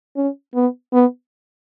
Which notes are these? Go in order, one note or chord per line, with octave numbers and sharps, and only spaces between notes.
C#4
B3
B3